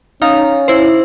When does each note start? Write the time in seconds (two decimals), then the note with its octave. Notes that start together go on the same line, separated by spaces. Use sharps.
0.22 C#4 D#4 F5 A#5
0.68 E4 C5